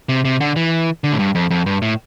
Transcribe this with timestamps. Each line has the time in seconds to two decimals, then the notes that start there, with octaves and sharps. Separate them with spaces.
0.09 C3
0.25 C3
0.41 D3
0.56 E3
1.04 D3
1.12 A2
1.19 G2
1.35 F2
1.50 F2
1.66 G2
1.82 A2